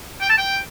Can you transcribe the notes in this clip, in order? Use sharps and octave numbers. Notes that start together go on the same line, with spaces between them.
G5
A5
G5